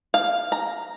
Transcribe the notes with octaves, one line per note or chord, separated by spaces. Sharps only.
F5
A#5